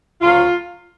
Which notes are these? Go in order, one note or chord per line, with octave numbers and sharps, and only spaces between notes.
D2 C#3 F#3 F4